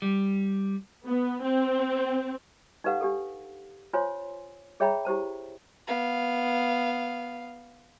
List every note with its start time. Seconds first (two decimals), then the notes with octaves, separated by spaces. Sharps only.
0.02 G3
1.07 B3
1.42 C4
2.84 D#4 G4 A4 B4 F5 F#5
3.01 D4 G4 A4
3.93 F4 C5 C#5 G#5 C6
4.80 G#4 C#5 E5 G5 A#5 B5
5.05 E4 G4 C5 A5
5.87 B3 F5